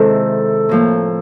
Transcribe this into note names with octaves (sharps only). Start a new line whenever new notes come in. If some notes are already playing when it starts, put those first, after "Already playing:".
Already playing: C3 D#3 G#3 C4 E4 A4
A2 F3 A#3